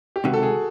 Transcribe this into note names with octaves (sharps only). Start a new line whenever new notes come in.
G4
C#2 C3 D#3 F#4
A4
G#4